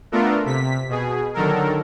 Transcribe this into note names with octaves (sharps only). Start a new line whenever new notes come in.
A3 B3 D4 F4 A4 A#4
C3 B6
B2 G#4
D3 D#3 F#3 A4 A#4